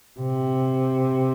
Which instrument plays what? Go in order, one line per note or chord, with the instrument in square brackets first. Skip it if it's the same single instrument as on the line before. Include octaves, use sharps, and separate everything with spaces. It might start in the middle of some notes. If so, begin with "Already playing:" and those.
[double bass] C3